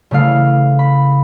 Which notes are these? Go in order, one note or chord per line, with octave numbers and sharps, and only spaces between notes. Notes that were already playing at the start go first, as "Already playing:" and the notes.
C#3 E3 A3 F5
B5